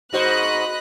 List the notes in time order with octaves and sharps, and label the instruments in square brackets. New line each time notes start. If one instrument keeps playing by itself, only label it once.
[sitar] G#2 F#4 C5 [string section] D#5 B5 F#6